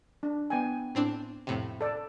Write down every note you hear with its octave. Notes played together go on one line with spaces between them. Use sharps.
D4
B3 G5 G#5
A2 C4 D4
F2 A2 C3
A4 D5